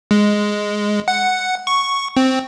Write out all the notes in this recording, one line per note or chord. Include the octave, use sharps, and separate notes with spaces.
G#3
F#5
C#6
C4